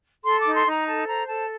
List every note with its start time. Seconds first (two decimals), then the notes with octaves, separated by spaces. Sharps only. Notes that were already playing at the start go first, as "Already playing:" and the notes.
0.25 A4 C6
0.40 D6
0.45 D#4
0.55 C6
0.66 D#4 A#5
0.86 A4 A5
1.07 C5 A#5
1.28 A4 A5